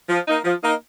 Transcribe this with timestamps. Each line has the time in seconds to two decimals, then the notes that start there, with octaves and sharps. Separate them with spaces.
0.09 F3
0.27 A#3 D#4
0.44 F3
0.63 A#3 D#4